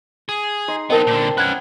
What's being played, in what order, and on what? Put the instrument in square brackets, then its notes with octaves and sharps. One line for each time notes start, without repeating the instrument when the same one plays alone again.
[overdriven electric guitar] G#4
[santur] D#4 C6 D#6
[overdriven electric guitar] B3 D#4 [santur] C4 A5 [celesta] A#4 D#5
[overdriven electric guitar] A#2 D3
[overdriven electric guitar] C#4 B4 [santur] F#5 [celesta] F#6 G#6